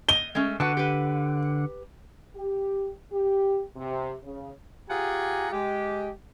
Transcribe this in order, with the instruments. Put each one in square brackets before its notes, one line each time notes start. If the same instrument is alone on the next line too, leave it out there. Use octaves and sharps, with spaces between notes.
[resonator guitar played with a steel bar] D#5 [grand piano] G7
[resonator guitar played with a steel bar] G#3 A3 C#4
[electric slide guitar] D3 F#5 [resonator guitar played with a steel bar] F#4 B4 A5
[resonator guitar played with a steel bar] G4 B4
[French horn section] G4
G4
C3
C#3
[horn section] F4 G4 G#4 F#5 G#5 A#5
G#3 G4